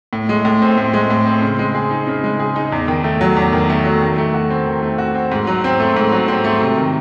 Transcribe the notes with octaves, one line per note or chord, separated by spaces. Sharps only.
A2
G#3
A2
C4
A2
G#3
A2
C4
C#3
G#3
G#4
D#4
C#3
G#3
G#4
D#4
E2
D#3
A3
F#3
E2
D#3
A3
F#3
D#3
A3
F#4
C4
D#3
A3
F#4
C4
G#2
F#3
C4
A3
G#2
F#3
C4
A3
C3
D#3